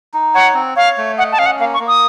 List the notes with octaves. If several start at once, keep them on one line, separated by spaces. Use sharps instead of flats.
D#4
C#5 F#5
C4
C#5 F5
A3
D#5 F#5
A5
C#4 F5
F#5
A#3 F5
C#6
A#3
D#6